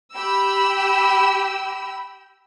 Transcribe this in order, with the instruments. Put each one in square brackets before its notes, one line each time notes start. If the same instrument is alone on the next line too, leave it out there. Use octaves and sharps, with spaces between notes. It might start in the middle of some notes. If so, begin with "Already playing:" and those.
[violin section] G4 G5 B5 E6